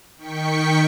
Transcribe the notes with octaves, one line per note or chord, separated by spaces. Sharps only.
D#3 G5 C#6 B6 C#7